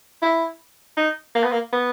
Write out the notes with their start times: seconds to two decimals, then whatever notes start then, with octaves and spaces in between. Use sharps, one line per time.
0.22 E4
0.97 D#4
1.35 A#3
1.43 B3
1.52 A#3
1.72 B3